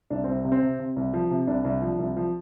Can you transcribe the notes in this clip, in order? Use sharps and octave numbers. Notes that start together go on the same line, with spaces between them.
C2 D4
C2 C4
C3
C4
C3
C3
C2
F3
C3
C2 D4
C2
F3
C2
F3